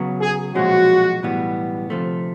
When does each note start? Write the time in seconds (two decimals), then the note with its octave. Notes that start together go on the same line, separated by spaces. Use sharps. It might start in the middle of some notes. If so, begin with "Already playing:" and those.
Already playing: C#3 F#3 B3
0.21 G#4
0.55 B1 A#2 F3 G#3 C#4 F#4
1.22 B1 A2 E3 G3 B3
1.90 D2 C3 F3 A3